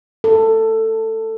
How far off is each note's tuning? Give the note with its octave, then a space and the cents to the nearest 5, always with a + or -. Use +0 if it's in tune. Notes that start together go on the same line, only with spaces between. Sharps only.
A4 +15